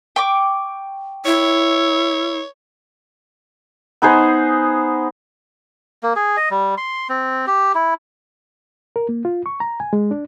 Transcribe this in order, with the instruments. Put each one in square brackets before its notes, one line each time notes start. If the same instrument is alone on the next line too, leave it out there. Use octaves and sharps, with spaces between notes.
[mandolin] G5 C#6 D6
[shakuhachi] E4 [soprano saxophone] C#5
[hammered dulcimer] B3 D#4 G#4 C5
[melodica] A#3
G#4
D#5
G3
C6
C4
G4
E4
[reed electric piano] A#4
A#3
F4
C#6
A#5
G#5
G#3
D4